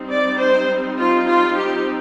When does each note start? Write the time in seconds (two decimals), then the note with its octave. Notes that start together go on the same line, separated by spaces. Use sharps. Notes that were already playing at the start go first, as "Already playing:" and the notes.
Already playing: G3 C4 D#4
0.10 D5
0.39 C5
0.98 F4
1.28 F4
1.57 G4